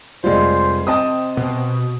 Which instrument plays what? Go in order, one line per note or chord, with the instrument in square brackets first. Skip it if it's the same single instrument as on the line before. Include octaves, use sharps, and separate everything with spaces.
[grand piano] F1 F4 [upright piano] G3 G#3 [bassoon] C5
[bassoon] C3 [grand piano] C4 D#5 A5 [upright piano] D#6
[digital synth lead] B2